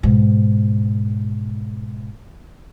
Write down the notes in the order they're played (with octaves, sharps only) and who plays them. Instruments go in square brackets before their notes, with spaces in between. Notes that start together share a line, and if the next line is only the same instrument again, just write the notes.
[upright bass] G#2 B2